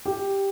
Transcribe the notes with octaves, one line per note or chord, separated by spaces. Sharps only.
G4